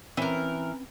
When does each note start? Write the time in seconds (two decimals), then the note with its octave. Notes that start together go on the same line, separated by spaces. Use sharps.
0.17 E3 C4 C#4 A#4 B4